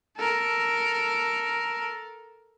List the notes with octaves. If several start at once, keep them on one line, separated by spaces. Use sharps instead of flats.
A4 A#4